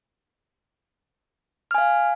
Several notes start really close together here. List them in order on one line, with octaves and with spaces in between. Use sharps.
F6 G#5 F5